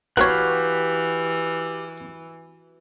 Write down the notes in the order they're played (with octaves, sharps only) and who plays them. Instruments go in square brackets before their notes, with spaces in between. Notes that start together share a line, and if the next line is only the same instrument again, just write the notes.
[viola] E3 [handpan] F#4 B4 [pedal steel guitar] G4 F5 F#5 [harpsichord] A#4 C#5